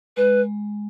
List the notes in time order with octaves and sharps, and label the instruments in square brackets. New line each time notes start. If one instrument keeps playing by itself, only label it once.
[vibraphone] G#3 [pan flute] B4